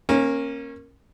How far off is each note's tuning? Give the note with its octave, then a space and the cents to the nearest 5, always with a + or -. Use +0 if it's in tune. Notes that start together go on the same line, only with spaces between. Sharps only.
A#3 +0 C#4 -25